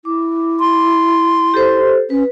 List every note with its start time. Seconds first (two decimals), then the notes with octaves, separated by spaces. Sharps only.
0.05 E4 D6
0.60 C6
1.54 G4 A4 C5
2.10 C#4 B4